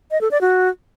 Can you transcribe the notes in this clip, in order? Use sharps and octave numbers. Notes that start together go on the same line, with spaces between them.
D#5
A4
D5
F#4